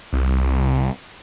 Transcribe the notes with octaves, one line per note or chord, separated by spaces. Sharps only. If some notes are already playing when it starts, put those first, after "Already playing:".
C2